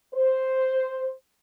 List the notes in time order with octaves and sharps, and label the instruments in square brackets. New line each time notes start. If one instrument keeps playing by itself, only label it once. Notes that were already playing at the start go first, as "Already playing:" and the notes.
[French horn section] C5